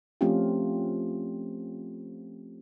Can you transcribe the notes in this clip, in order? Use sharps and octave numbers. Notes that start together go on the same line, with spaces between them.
F3 A3 C4 C#4 F4 G4